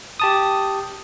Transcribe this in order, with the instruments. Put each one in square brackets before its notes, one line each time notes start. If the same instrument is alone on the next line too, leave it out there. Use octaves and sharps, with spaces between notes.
[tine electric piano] G4 A5 D#6